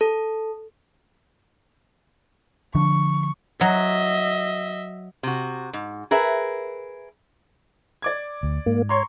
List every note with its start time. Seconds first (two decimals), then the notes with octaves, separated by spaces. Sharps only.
0.01 A4
2.75 D3 F3 D4 C#6
3.61 F#3 D#5 E5
5.23 C3 F#4
5.73 G#2
6.11 G#4 A#4 B4 E5
8.02 D5 D6 G#6
8.43 D2
8.66 G#2 A#3
8.89 C#5 A#5 C6 C#6